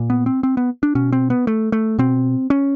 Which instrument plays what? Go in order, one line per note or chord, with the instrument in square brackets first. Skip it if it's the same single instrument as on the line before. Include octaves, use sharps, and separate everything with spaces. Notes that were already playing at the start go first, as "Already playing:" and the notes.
Already playing: [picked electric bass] A#2
B3
C4
C4
B3
D4
B2 C#4
C4
B3
A3
A3
B2 C4
C#4